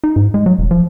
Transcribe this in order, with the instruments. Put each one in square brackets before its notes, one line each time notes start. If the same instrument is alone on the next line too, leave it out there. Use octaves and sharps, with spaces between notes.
[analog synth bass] D#4
G#2
G#3
F#3
E1
F3